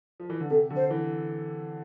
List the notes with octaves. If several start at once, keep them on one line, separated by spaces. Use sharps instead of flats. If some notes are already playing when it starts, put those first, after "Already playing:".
F3
E3
D3
C3 A4
D3
C5
E3